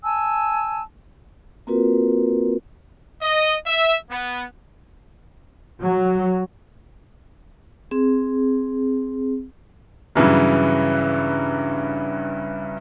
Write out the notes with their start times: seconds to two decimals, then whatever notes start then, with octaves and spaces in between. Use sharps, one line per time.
0.03 G#5 A5 E6
1.67 A#3 C4 F4 F#4 A#4 B4
3.22 D#5
3.67 E5
4.11 B3
5.83 F#3
7.91 C4 G#4
10.15 G2 C#3 E3 F#3